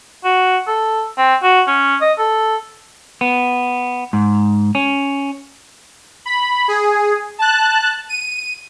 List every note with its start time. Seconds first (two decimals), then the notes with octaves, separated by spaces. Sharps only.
0.24 F#4
0.67 A4
1.18 C4
1.43 F#4
1.67 C#4
2.01 D#5
2.18 A4
3.21 B3
4.13 G#2
4.75 C#4
6.26 B5
6.68 G#4
7.39 A5 F#6
8.09 D#7